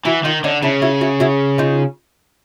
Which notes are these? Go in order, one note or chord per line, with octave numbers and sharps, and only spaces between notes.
E3 E4 F#4
D#3 D#4 F4
D3 C#4 D#4
C#3 D4 E4
E4 F#4
E4 F#4
E4 F#4
D#4 F4